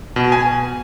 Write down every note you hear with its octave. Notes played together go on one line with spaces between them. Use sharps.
B2
G#5